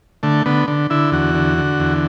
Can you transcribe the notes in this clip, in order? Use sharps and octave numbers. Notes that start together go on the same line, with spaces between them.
D3 A3
D3 B3
D3
D3 E4
E2 F#4
D3
D3
E2